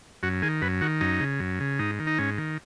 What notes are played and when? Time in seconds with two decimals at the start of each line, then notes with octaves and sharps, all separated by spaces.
0.23 F#2 F#4
0.42 D#3 G#4
0.62 F#2 B4
0.81 D#3 F#4
1.01 F#2 D#4
1.20 C#3
1.40 F#2
1.60 C#3
1.79 G#2 D#4
1.99 D#3
2.07 D#4
2.18 G#2 C#4
2.38 D#3